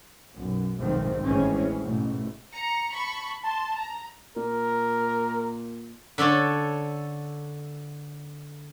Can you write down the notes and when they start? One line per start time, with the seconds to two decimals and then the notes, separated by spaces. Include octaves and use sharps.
0.34 B1 F#2
0.78 F1 B1 G#2 D#3 F3 C4
1.24 A1 E2 E3 G#3 C4 C#4
1.81 A1 G#2 B2 A3
2.52 A#5 C#7
2.94 A5 B5 C#6
3.43 A5 C6
3.75 A#5
4.37 A#2 A#4
6.18 D3 D4 A4 C#5